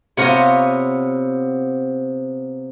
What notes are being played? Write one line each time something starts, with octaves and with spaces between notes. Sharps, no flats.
C3 B3 F4 C#5 G#5 A#5